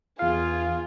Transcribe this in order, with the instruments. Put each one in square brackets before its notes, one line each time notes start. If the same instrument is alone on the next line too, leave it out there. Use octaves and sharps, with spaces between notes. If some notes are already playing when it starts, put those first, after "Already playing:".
[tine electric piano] E2 F5 [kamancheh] F4 G#4